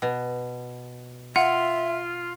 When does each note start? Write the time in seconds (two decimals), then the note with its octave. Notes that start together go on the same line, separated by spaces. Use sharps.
0.02 B2
1.36 F4 E5 F#5